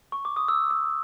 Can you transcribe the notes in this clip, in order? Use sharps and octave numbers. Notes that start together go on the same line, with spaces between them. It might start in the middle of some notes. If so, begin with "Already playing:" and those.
C#6
D6
D#6
E6
E6